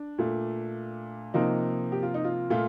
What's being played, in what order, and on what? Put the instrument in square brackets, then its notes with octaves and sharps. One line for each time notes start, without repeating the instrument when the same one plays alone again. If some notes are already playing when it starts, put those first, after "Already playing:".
Already playing: [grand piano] D4
A#2 A3
C3 F3 A#3 D#4
G4
F4
D#4
F4
A#2 A3 F4